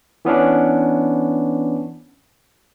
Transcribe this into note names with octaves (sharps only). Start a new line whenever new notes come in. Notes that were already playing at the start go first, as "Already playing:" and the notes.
E3 B3 C#4 D4